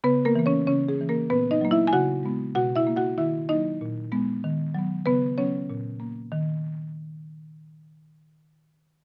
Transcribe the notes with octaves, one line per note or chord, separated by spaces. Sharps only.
C#3 B3 B4
A#3 A#4
E3 A#3
C#4 C#5
C#3 C#4 C#5
G#4
E3 A#3
A#3 A#4
A#2 B3 B4
D#4 D#5
F#3 A#3
E4 E5
G#5
C#3 F#4 F#5
G#3 B3
B2 F#4 F#5
E4 E5
A#3
F#4 F#5
D#3 E4 E5
F#3 A#3 D#4 D#5
A#2
G#3 B3
D#3
F#3 B3
C#3 B3 B4
F#3 B3 C#4 C#5
A#2
A#3
D#3